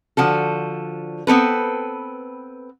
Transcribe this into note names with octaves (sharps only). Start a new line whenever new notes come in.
D3 F3 F#4 A4
B3 C4 A4 B4